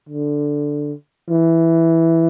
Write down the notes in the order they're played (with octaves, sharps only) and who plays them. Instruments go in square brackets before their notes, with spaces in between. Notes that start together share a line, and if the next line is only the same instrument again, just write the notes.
[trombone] D3
E3